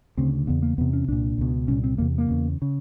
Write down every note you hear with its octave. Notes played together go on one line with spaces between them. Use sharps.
D2 C#3 C4
E2 C#3 B3
A#3
E2 C3 B3
C#4
C2 A#2 D4
C#2 B2
C2 A#2 C#4
C4
E2 C3 A#3
A#3
E2 C#3
C#3